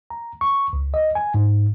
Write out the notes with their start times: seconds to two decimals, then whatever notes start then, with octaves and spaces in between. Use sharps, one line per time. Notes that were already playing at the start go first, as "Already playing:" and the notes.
0.10 A#5
0.41 C#6
0.73 C#2
0.94 D#5
1.15 G#5
1.34 G#2